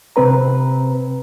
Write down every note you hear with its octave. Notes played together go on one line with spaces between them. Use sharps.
C3 C4 B4 A#5